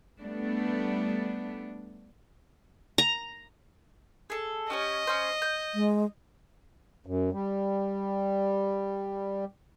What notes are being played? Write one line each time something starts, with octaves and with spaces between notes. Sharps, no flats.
G3 A3 B3 D4
A#5
G#4 A4
C#4 G4 C#5 D#5
C#4 C5
G6
G#3
F#2
G3